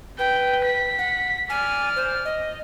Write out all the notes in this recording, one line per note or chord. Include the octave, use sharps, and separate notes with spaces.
B4 G5
B6
F#5
D5 G#5 F6
C5
D#5